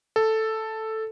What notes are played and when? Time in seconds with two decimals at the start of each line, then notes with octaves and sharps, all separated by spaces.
0.16 A4